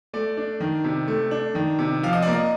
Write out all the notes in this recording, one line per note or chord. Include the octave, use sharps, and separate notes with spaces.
A3 D5
D4
D#3
C3
A3
D4
D#3
C3
F3 F5
D#5
A#3 D5
D#5